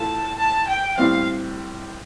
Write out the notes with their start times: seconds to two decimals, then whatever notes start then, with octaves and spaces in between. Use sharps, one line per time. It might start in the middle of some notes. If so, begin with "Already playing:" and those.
Already playing: A2 A3 F4 A5
0.38 A5
0.68 G5
0.98 A2 G3 C4 F5